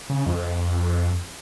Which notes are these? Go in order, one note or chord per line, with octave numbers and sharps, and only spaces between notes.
C#3
F2